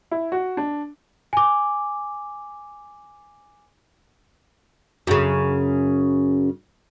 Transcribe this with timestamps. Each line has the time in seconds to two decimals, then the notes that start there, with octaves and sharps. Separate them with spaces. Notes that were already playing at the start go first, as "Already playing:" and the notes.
0.11 E4
0.32 F#4
0.57 D4
1.33 G#5 D6
5.07 F#2 C#3